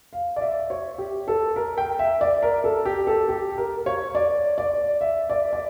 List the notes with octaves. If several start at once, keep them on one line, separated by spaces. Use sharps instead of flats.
F5
D5
E5
C#5
G4
A4
A#4
G5
E5
D5
A#4
A4
G4
A4
G4
A#4
C#5
D5
D5
E5
D5
D5